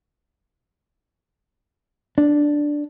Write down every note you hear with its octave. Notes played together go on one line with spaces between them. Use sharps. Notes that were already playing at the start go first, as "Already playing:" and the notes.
D4